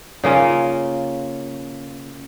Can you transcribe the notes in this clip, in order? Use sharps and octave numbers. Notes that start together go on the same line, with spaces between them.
C#3 A#3 C#4 F4